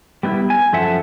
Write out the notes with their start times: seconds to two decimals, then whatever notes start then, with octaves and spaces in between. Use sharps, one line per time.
0.23 G3 B3 D#4 E4
0.50 G#5
0.72 F#2 F3 A4 E5 F#5 A5